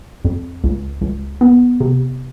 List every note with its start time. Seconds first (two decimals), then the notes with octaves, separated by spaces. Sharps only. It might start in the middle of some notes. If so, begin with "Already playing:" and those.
0.25 F2
0.64 C#2
1.01 C#2
1.41 B3
1.80 C3